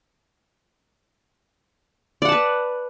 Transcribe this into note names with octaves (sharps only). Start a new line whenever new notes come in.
B4 D5 F#5 A5